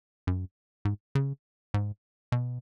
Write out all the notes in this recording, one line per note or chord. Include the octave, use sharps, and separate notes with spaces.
F#2
G#2
C#3
G#2
B2